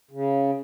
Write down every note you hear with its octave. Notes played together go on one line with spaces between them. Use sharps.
C#3